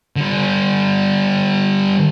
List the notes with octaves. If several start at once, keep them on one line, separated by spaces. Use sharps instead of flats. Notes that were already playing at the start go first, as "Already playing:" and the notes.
D3 G3